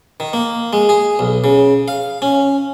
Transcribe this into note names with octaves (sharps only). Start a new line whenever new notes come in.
D#3
A#3
G#3
G#4
B1
C#3
F5
C#4